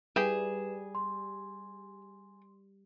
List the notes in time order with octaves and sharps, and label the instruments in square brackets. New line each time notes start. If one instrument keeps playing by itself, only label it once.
[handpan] G3 [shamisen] E4 G4 [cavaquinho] G#4 [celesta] B4 E7
[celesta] C6